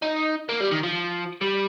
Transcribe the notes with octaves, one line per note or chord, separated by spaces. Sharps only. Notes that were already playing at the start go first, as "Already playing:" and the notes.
D#4
A#3
G3
D#3
F3
G3